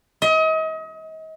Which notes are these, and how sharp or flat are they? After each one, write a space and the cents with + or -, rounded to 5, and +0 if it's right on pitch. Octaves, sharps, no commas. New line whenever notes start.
D#5 +35